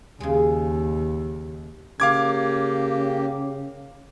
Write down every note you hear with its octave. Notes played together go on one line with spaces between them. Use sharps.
D#2 C#3 G#3
C#3 A#3 G4 F5 D6 G#6